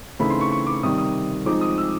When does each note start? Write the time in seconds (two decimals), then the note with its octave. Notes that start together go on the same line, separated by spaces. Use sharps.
0.19 C#3 E3 A3 C4 D#4 B5
0.30 C6
0.41 C#6
0.51 C#6
0.67 D6
0.83 C3 D#3 G3 D#6
0.98 D#6
1.46 F3 G#3 C4 D#4 D6
1.61 D#6
1.78 E6